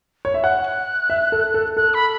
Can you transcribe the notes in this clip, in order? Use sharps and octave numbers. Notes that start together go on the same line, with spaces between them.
C#5
E5
F#5 F#6
E5
A4
A4
A4 F#6
B5